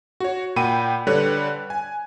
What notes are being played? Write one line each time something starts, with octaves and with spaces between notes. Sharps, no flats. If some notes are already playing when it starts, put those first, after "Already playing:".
F#4 C#5
A#2 F#5 G5 B5 D#7
D3 G3 B4 C#5 F#6
G#5